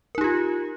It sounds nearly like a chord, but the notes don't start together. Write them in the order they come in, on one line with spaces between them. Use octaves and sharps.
A#4 D#4 G4 F4